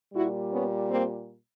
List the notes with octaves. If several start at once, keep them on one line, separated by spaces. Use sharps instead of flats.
A#2 G3 E4 F#4
B3 C#4
A#3 C4